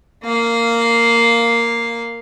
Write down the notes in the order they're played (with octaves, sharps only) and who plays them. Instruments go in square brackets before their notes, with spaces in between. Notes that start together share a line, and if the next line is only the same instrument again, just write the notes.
[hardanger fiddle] A#3 F5